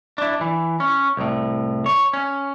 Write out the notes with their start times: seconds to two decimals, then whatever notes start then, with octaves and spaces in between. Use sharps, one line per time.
0.18 D4 E4
0.41 E3
0.80 C#4
1.17 C2 A2
1.86 C#5
2.13 C#4